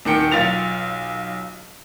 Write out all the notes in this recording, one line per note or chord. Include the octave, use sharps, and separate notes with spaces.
D#1 D#3 G5 C#7
B1 F4 A6 F7